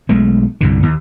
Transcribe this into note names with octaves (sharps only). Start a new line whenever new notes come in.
B1 G#3 A3
C2 G2 D3
D#2